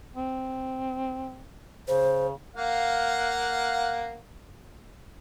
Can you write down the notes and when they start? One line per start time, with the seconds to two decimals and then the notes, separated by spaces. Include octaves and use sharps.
0.15 C4
1.88 C#3 C5
2.55 A#3 F5 F#5